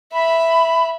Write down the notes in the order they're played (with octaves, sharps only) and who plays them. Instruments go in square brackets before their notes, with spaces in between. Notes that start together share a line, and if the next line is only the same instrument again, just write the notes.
[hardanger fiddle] E5 [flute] B5